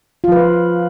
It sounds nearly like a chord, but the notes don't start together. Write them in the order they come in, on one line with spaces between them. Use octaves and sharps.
F4 F3 B4